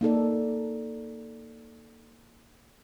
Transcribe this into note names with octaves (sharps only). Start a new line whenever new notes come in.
A#3 D#4 A4 D5